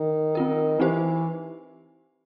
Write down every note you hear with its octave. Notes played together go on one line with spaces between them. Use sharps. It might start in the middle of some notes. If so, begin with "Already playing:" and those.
Already playing: D#3
C4 F4 A#4
E3 C4 D#4 G4 C5